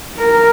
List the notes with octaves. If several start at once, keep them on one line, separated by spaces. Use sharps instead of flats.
A#4